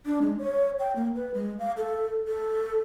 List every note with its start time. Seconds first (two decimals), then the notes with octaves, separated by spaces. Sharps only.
0.06 D4
0.22 G#3
0.38 C#5
0.80 G5
0.96 A#3
1.15 B4
1.34 G#3
1.59 F5
1.77 A4
2.27 A4